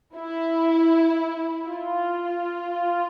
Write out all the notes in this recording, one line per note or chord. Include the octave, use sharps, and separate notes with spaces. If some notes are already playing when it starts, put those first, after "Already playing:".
E4
F4